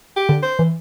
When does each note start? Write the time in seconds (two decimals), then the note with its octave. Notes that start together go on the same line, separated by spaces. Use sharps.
0.16 G4
0.29 D3
0.43 C5
0.59 E3